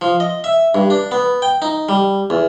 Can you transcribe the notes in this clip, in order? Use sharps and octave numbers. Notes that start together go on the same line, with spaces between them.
F3
D#5
E5
G2
D4
B3
G5
D#4
G3
E2